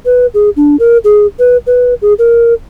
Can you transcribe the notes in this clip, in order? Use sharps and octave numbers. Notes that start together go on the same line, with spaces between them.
B4
G#4
D4
A#4
G#4
B4
B4
G#4
A#4